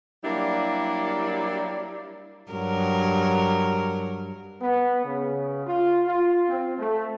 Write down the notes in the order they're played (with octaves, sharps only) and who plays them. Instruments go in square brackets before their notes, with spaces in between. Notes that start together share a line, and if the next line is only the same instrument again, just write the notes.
[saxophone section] F#3 G3 A#3 D4 E4
[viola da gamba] G2 F#3 A#4
[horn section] B3
C#3
F4
F4
C4
A3